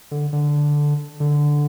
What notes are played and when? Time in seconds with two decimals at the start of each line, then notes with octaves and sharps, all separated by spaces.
0.11 D3
0.33 D3
1.20 D3